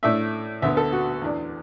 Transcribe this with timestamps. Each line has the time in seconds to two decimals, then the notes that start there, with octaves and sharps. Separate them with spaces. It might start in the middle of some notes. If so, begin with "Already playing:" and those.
0.03 A2 A3 D4 E5
0.62 D2 D3 B3 E5
0.77 A4
0.92 F#4
1.22 E2 E3 D4